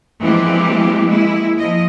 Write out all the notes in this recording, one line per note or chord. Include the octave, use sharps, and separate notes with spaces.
E3 F3 G#3 A#3 C4 G4
G#3 A#3 E4
F3 D#5